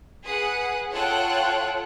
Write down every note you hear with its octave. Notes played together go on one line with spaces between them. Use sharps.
G#4 B4 F#5 D#6
F4 A4 C#5 F#5 G5 F#6